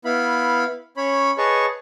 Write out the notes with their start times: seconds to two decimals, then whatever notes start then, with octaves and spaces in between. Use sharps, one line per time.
0.05 B3 E4 F5 B5
0.97 C#4 C#5 B5
1.38 G#4 B4 C#5 D#5 A5 C#6